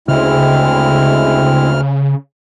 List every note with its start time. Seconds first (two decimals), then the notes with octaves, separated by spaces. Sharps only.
0.08 D2 C#3 G#3 C4 E4 F6